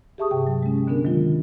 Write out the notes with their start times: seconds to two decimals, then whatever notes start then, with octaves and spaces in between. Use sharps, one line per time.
0.18 G4 G#4 E5 A5 C#6 D#6
0.31 G2 C3 G5
0.47 F#3
0.63 G#3 C#4
0.87 D3 B3 C#4 D4 A#4
1.05 D#3 F#3 G#3 F4